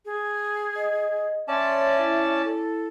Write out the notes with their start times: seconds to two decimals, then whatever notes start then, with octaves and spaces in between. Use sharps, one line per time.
0.05 G#4
0.76 D#5
1.48 C#4 C#5 D5 E5 A5 C6
1.98 E4
2.44 A4